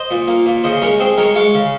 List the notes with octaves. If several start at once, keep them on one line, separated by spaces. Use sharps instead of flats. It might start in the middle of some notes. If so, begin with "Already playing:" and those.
Already playing: C5 D#5
A#2
A#3
A#2
C#3 C5 D#5
G#3 A#4 C#5
C4 G#4 C5
G#3 A#4 C#5
G#3 C#5 F5
C#3